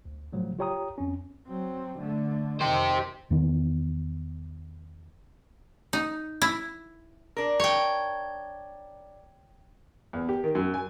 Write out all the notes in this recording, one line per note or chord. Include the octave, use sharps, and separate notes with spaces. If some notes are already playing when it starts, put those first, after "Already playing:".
D2
A2 C#3 F3 F#3 A3
F4 G4 C#5 G5 A#5 D#6
F2 C4 C#4
F#3 C4
D3 A3
F2 D#3 G4 C5
E2 D#3 B3
D#4
E4
D4 A#4
C#5 G5
E2
G4
D#3
F#2
G#5